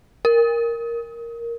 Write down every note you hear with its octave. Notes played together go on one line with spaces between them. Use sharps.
A#4